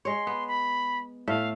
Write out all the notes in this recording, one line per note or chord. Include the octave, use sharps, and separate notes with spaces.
G#3 C#5 C6
B3
B5
A2 A3 E5 F5